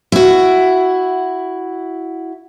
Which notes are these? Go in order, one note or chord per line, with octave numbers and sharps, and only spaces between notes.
E4 F#4